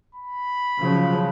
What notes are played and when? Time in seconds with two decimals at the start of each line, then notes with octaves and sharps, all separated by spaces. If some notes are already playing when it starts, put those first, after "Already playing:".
0.15 B5
0.79 C#3 F3 F#3